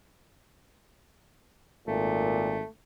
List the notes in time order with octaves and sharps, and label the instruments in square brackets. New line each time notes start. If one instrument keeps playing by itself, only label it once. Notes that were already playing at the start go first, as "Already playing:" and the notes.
[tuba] G#1 [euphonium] A#2 [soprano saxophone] A3